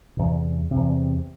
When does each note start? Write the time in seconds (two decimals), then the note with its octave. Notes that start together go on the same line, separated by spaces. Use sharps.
0.17 E2 C3
0.71 C3
0.76 E2